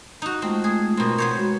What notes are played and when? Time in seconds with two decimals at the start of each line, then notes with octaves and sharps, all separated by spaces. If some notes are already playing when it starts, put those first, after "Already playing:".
0.22 D#4 F#4
0.42 G#3 A3 C4 F4
0.64 G#4
0.97 B2 C4 A#4 A#5 C6
1.18 B3 C5 C#5
1.35 G#3 F#4